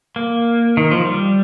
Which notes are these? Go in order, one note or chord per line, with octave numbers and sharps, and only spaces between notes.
A#3
D#3
F3
G3